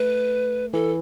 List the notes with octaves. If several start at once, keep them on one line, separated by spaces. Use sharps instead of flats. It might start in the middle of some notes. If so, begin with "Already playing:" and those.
Already playing: A3 B4
E3 A4